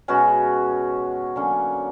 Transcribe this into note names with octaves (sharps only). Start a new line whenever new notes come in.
B2 G#3 C#4 F#4
D3 F#3 A#3 C#4